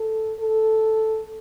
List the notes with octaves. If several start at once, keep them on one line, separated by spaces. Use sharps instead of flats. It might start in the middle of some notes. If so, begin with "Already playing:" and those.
Already playing: A4
A4